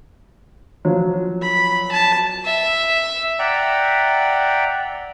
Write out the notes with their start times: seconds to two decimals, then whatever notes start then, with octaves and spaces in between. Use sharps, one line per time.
0.85 F3 F#3
1.41 B5
1.91 A5
2.45 E5
3.39 D5 E5 F#5 G5 A#5